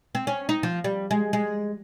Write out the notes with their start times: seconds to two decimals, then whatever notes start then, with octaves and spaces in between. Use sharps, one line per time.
0.15 C4
0.27 C#4
0.49 D#4
0.63 F3
0.84 G3
1.11 G#3
1.33 G#3